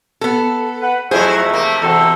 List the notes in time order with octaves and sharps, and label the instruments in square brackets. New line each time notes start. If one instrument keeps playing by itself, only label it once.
[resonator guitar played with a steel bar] B3 A4
[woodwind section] B4 F#5
[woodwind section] F2 [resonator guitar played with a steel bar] F3 G#4 [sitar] F#3 E4 C5 [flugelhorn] A3
[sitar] C3 A#3
[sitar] E2 C3 [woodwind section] C4 F#4 [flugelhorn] A4